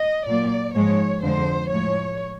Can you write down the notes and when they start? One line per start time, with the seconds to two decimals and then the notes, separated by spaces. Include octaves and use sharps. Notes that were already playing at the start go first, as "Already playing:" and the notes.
Already playing: D#5
0.26 A#2 F#3 A#3 D5
0.74 G#2 F3 G#3 C#5
1.22 F2 D3 F3 G#3 C5
1.71 A2 F3 G#3 C#5